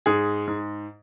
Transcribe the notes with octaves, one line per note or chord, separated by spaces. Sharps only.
G#2 G#4
G#2